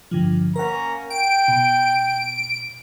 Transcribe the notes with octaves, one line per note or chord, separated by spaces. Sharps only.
G2 D3 F3
A#3 C#4 A#4 F#5 A#5
G5 D7
B2